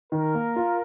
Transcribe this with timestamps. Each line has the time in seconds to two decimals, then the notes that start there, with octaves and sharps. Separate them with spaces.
0.12 D#3 A#4
0.35 A#3
0.56 F4